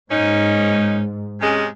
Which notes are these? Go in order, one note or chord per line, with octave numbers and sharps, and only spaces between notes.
G#2 A#3 C#4 D#4
C3 G#3 C#4